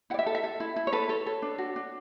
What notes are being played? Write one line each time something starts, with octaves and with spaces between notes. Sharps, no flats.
E4 D5 F#5
E5
A4
E5
A4
E4
E4
C#5
A4 B4
A4 C#5
A4
D4
F#4
D4